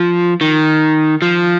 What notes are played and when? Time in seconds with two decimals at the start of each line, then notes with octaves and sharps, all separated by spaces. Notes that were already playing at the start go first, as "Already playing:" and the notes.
Already playing: F3
0.41 D#3
1.22 F3